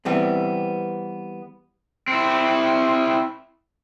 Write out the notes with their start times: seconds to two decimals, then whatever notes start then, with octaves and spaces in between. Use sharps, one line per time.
0.05 E3 G3 B3 C4
2.08 C4 E4